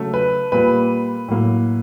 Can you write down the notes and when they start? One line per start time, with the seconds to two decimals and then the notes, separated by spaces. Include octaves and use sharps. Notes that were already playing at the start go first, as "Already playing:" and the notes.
Already playing: C#3 F#3 A3
0.14 B4
0.52 A#2 G3 A#3 B4
1.28 A2 F#3 A#3